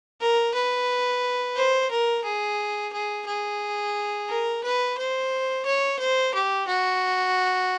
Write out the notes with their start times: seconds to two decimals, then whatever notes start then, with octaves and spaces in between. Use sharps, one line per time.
0.20 A#4
0.54 B4
1.56 C5
1.91 A#4
2.25 G#4
2.93 G#4
3.27 G#4
4.29 A#4
4.64 B4
4.98 C5
5.66 C#5
5.99 C5
6.34 G4
6.68 F#4